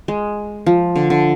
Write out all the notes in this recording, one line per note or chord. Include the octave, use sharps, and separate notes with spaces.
G#3
F3
D3
D3